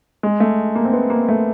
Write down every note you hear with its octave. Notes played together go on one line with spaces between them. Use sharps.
G#3
A3
A#3
C4
B3
A#3
A3